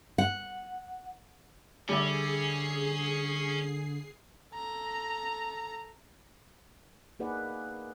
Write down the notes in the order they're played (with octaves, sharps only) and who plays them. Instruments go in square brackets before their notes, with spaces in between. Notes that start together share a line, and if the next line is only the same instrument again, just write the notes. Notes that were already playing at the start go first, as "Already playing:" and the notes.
[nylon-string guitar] F#5
[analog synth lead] D3 [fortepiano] G3 D5 E5 [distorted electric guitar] C#4 [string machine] G#4 C7
[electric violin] A4 A#5
[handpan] A#3 D#4 G#4 B4 D5 F#5